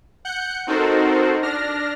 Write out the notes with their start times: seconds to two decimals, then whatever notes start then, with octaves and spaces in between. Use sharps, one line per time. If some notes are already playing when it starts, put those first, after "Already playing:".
0.25 F#5 F#6 G6 C#7
0.67 C4 D#4 F#4 A4 A#4 C5
1.43 D4 F6 A#6